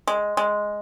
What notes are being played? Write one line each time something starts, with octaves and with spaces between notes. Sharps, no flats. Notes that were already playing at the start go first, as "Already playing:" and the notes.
G#3
G#3